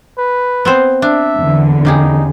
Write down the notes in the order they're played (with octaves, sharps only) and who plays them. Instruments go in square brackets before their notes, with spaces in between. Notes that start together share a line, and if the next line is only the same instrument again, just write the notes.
[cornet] B4
[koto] B3 C4 C5
[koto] D4 [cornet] E5
[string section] E2 D3
[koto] C#3 G4 G#4 [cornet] D#4